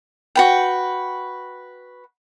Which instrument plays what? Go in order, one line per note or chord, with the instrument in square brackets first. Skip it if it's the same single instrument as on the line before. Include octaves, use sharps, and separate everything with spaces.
[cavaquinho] F#4 B4 G5